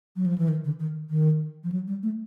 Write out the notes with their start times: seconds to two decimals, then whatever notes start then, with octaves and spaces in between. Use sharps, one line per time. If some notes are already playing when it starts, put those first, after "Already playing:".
0.16 F#3
0.26 F3
0.38 E3
0.48 D#3
0.64 D3
0.80 D#3
1.10 D#3
1.64 F3
1.72 F#3
1.87 G3
2.03 A3